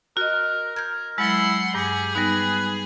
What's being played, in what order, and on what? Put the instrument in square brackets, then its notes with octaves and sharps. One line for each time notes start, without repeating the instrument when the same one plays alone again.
[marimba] F#4 D#5 [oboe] A#4
[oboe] A#4 [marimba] G6 G#6
[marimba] F#3 G#3 [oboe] E4 [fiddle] F#5 C6
[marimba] G2 [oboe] G4 [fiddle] G#4
[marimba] G3 B3 D#4 [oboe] B4